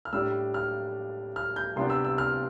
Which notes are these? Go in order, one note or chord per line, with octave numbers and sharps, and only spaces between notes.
F6
A2 G3 D4 E6
F6
F6
G6
C3 G3 B3 D4 C6
E6
E6
F6